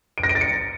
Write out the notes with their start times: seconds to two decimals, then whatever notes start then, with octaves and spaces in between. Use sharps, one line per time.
0.18 D7
0.23 A#6
0.29 D7
0.35 A6
0.41 C#7